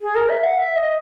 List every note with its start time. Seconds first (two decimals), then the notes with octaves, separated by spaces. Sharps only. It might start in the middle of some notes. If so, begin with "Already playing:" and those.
0.01 G#4
0.15 A#4
0.29 E5
0.43 F#5
0.58 E5
0.76 D#5